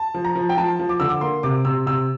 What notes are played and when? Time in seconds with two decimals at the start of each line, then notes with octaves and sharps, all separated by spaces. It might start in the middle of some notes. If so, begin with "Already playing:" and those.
Already playing: A5
0.14 F3
0.25 A#5
0.35 F3
0.49 G5
0.57 F3 A5
0.79 F3
0.89 D6
1.00 D3 E6
1.09 D6
1.21 A#3 C6
1.43 C3 D6
1.65 C3 E6
1.86 C3 E6